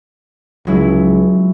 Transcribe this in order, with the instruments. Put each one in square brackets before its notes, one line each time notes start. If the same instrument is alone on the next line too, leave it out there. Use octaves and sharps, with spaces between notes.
[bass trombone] C#2 [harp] F#3 G#3 E4